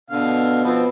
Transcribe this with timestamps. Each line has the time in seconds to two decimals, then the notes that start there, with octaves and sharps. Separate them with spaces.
0.10 B2 D3 B3 F5
0.64 F3 C4 B4